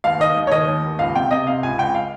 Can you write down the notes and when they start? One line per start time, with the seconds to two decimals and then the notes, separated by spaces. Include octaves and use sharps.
0.04 D#2 F5
0.20 D#3 D#5
0.37 D#2
0.47 C#5
0.51 D#3 D#5
0.68 D#2
0.83 D#2
0.99 C#2 F5
1.15 C3 G5
1.31 C3 D#5
1.47 C3 F5
1.63 C#2 G#5
1.78 C#2 G5
1.95 F5